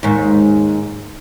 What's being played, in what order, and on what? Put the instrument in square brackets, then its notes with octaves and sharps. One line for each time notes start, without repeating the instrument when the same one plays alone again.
[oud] D#2 G#2